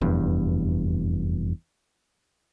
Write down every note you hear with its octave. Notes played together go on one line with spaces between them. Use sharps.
F1 E2 G2